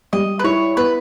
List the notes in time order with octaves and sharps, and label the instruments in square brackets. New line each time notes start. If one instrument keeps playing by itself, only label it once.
[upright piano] G3 [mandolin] D#5
[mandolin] B4
[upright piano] E4 [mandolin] C#5
[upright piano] B3 [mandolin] B4